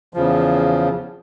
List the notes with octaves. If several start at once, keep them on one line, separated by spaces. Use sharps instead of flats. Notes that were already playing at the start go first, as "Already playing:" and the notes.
E2 C#3 F3